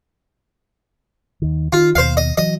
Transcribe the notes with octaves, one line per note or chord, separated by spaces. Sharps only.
D#2 D#3
D#3 F4
D#2 B2 C5 F5
D#5
E3 F#3 D#5